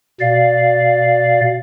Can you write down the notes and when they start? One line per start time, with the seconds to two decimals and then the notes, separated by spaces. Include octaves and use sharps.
0.21 B2 D5 F5